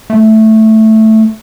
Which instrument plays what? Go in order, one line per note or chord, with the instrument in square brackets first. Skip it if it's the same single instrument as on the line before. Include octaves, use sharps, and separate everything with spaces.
[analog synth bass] A3